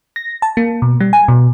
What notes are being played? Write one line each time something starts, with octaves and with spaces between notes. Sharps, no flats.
A#6
A5
A#3
B2
G3
G#5
B2